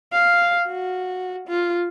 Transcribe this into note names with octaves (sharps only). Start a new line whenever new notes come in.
F5
F#4
F4